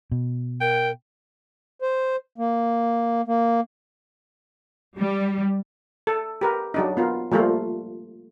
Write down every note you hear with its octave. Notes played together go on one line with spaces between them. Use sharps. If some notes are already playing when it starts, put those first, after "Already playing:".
B2
A#4 G5
C5
A#3
A#3
G3
A4
G4 A#4 B4
F#3 D4 D#4
B3 F4 A#4
F3 G3 A3 A#3 F4